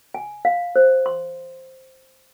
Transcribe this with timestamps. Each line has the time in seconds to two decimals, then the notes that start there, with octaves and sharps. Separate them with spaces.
0.14 G#5
0.45 F5
0.76 C5
1.06 C6